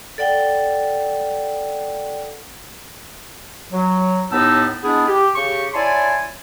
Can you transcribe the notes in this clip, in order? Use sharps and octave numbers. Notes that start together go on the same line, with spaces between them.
A4 D5 F#5 G5
F#3
D#2 A2 B3 D#4 A5 E6
G#3 B3 D4 E4 G#4
G4
C#3 G4 C#6
E4 C#5 D5 G#5 A5 C6